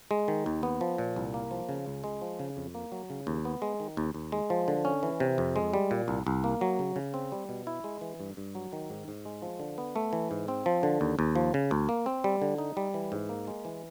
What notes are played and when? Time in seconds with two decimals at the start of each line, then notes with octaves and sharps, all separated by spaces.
0.11 G#3
0.28 D#3
0.46 D#2
0.63 B3
0.81 F3
0.98 A#2
1.16 C2
1.34 A#3
1.51 F3
1.69 C#3
1.86 C#2
2.04 G#3
2.22 F3
2.39 C#3
2.57 F2
2.75 A#3
2.92 F#3
3.10 C#3
3.27 D#2
3.45 B3
3.62 G#3
3.80 D#3
3.97 D#2
4.14 D#2
4.32 G#3
4.50 F3
4.68 D3
4.85 C#4
5.03 E3
5.20 C3
5.38 F2
5.56 G#3
5.74 G3
5.91 A#2
6.08 C2
6.27 C2
6.44 A#3
6.61 F#3
6.79 C#3
6.96 C#3
7.14 C4
7.32 G3
7.49 B2
7.67 E4
7.84 G#3
8.01 E3
8.20 G2
8.37 G2
8.55 F#3
8.73 D#3
8.90 G#2
9.08 G#2
9.26 G#3
9.42 F3
9.60 D3
9.78 B3
9.96 A3
10.13 E3
10.31 G#2
10.48 C4
10.66 F3
10.83 D3
11.01 D#2
11.19 D#2
11.35 F3
11.54 C#3
11.71 D2
11.89 A#3
12.06 C4
12.24 G3
12.42 D3
12.58 D#4
12.77 G3
12.94 E3
13.12 G#2
13.29 A#3
13.47 G#3
13.65 E3